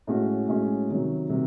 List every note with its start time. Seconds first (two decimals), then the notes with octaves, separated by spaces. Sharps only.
0.07 A2 G#3 C#4 F#4
0.48 A2 G#3 C#4 F#4
0.89 C3 D#3 F#3
1.29 C3 D#3 F#3